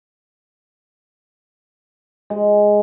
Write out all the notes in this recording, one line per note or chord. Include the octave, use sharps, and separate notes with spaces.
G#3